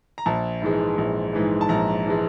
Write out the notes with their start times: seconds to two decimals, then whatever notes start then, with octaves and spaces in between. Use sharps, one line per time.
0.18 A#5
0.26 A#1 A5
0.62 G#2 E3 G#3
0.98 A#1
1.33 G#2 E3 G#3
1.61 A5
1.69 A#1 A#5
2.07 E3 G#3